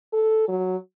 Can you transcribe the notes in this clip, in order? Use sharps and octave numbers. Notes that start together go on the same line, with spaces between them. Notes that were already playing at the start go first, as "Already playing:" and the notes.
A4
F#3